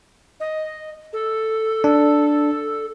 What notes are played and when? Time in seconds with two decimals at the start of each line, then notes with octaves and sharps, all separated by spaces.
0.40 D#5
1.13 A4
1.84 D4